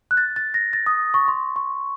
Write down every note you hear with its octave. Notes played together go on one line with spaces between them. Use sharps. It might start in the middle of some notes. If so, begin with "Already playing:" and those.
F#6
A6
A6
A#6
A6
D#6
C#6
C6
C#6